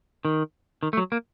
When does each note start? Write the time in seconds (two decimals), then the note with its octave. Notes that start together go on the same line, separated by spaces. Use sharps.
0.25 D#3
0.83 D#3
0.93 A3
0.97 F#3
1.12 A#3